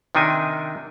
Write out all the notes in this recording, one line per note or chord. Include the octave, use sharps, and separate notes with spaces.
C3 D#3 D4 D#4 G#5